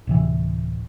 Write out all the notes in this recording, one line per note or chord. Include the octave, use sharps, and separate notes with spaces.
D1 C3 E3